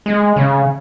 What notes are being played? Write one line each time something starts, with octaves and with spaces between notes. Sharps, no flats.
G#3
C#3